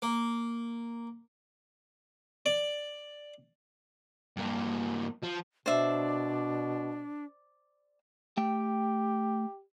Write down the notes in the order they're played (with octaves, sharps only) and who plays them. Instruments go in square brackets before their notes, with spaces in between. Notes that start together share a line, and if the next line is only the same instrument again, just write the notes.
[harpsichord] A#3
D5
[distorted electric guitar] G2 A#3
F3
[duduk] B2 [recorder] D4 [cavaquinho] C5 D5 E5
[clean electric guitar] A3 G5 [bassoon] G4